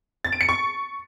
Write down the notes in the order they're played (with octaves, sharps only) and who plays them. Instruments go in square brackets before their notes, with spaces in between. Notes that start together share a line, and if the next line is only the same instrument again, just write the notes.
[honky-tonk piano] A6
D7
C#7
C#6